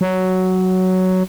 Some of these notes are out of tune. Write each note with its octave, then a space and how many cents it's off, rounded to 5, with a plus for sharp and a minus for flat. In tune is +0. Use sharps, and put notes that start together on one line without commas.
F#3 +5